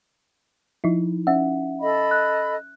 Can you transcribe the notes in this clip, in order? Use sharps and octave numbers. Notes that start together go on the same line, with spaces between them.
F3 D#4 E4
C#4 E5 F#5
A4 D#5 B5
F#6